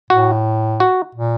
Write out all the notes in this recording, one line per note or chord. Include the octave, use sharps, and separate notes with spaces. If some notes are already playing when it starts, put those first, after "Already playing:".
A2 F#4
F#4
A#2